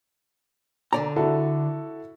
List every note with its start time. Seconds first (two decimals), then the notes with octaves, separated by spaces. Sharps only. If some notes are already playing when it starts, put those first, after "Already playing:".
0.93 D3 D5 A#5
1.16 E4 F#4 A4